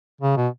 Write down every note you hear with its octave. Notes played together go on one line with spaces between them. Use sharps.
C#3
B2